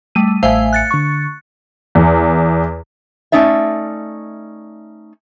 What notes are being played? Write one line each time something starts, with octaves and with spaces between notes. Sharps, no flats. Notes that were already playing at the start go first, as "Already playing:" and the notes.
G3 A3 D#7
A1 A3 C5 E5 F5 G#5
F#6 A6 C#7
D3 C#6
E2
A3 C#4 D#4 D5 E5